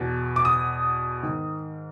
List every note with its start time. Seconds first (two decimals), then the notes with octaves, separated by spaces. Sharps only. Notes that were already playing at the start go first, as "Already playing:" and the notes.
Already playing: E2 B2
0.36 D6
0.45 D#6
1.23 G#2 D#3